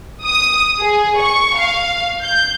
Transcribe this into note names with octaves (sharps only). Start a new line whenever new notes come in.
D#6
G#4
C#6
F5
G6